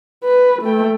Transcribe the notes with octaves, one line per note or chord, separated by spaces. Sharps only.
B4
A3 G5